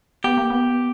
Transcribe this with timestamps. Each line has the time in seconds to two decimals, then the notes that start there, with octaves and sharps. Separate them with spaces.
0.24 B3 G4
0.37 A#3
0.50 B3